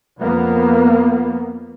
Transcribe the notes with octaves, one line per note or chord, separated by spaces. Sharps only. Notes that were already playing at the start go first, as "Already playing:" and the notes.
F2 A#3 B3